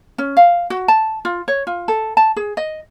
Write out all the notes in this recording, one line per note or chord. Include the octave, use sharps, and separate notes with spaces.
C#4
F5
F#4
A5
F4
C#5
F4
A4
A5
G#4
D#5